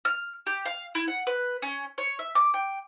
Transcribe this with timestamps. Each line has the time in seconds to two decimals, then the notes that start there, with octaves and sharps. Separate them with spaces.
0.05 F6
0.47 G4
0.66 F5
0.95 E4
1.08 F#5
1.27 B4
1.62 C#4
1.98 C#5
2.19 E5
2.35 D6
2.54 G5